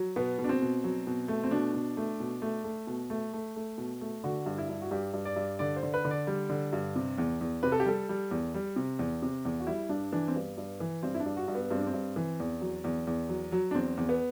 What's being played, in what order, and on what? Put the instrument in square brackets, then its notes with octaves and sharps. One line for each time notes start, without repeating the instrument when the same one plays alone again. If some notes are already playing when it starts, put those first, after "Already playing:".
Already playing: [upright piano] F#3
B2 B3
B2
D4
C4
B2
F#3
B2
A3
C4
B2 D4
B2
A3
B2
A3
A3
B2
A3
A3
A3
B2
A3
D3 F#4
G2
E4
G2
F#4
G2 G4
G2
D5
G2
D3 D5
C5
D3
B4
D3
D5
G3
D3
G2
C3
E2
E2
C3 B4
A4
G4
G3 A4
G3
E2
G3
C3
E2
C3
E2
F#4
G3 E4
G2 D4
E3 D4
C4
G2 B3
G2
E3
G2 C4
E4
D4
G2
F#4
G2
B3
G2 C4
D4
C4
G2
E3
E2
F#3
E2
E2
F#3
F#3
D4
E2 C4
E2
B3